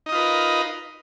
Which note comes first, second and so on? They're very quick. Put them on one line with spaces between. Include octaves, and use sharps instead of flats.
D#4 D#5 F4 B4 A#4